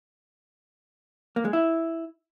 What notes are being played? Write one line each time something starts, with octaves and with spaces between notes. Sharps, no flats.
A#3
G#3
E4